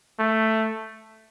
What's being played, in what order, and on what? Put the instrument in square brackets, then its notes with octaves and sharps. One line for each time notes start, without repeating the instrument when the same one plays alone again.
[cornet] A3